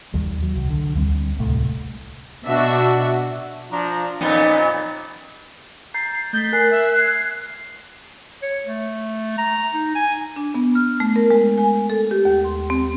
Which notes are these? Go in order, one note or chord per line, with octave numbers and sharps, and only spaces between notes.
D#2 D#3 G3
F#3
C2
D3
D2 G3 C4
D1 C2 A2 A3
B2 D4 F#4 E5
F3 D4 A#5
F2 A#2 B3 C#4 D#4
A#5 G6 A6 C7
A3 G6 A6 B6
A#4 G#5 F#6 C7
E5
F6 G#6 C7
C#5
A3
A#5
D#4
G#5
D4
B3
F6
A3
A#4
G#3
G#5
A4
G4
D#2
C6
C4